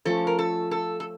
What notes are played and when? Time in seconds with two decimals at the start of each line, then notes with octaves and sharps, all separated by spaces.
0.05 F3 A3 C#4 A4
0.27 A#4
0.39 A4
0.71 A4
1.00 A4